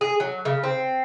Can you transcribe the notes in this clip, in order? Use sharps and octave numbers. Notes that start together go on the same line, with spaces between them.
G#4
F#3
C#3
C4